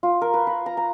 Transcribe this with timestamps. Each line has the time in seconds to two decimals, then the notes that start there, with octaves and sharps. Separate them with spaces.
0.03 F4
0.21 A#4
0.34 B4
0.47 B5
0.66 A#5
0.77 A#5